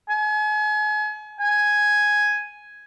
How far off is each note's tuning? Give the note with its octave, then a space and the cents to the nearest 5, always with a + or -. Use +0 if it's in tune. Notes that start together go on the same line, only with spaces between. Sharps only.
G#5 +35
G#5 +5